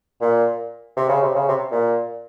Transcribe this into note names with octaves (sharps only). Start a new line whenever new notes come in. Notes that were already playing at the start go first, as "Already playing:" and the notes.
A#2
C3
C#3
C3
C#3
C3
A#2